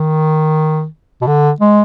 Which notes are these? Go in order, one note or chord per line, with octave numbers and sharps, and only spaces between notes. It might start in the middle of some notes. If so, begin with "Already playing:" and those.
Already playing: D#3
B2
D3
G#3